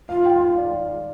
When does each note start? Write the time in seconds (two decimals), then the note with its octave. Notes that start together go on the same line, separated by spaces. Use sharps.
0.09 F4 F5
0.25 G5
0.41 F5
0.58 D5